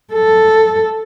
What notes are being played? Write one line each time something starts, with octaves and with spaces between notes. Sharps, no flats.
A4